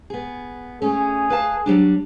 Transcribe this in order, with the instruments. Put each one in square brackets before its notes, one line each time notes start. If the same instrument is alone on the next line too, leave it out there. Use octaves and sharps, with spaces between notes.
[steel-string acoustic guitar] B3 G#4
[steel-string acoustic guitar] A3 C#4 [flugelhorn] G#4
[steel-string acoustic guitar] B4 F5 A5
F#3 G3 D4